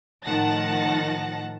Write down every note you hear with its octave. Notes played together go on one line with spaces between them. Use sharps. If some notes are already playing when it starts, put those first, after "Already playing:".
A2 D#3 F3 F#5 A5 A#6